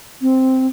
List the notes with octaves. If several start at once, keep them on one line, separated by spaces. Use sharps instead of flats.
C4